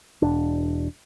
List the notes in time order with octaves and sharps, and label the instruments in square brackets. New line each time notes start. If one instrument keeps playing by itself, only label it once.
[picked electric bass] E1 D4